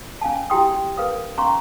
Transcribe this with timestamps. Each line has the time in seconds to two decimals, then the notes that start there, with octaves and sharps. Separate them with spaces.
0.21 C#4 F5 G#5 A5
0.50 E4 F#4 G4 G5 C6 D#6
0.97 A#4 B4 F5 D#6
1.38 C#4 F5 A#5 C6 C#6